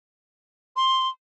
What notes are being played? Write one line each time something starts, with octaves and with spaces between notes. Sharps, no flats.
C6